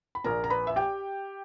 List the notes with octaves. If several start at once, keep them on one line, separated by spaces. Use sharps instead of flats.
B5
A#1 A#2 A#4 A#5
A#5
B4 B5
E5
G4 G5